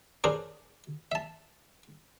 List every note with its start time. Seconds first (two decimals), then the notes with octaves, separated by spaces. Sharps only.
0.24 C#4 D4 G#4 A#4 C5
1.12 E5 A5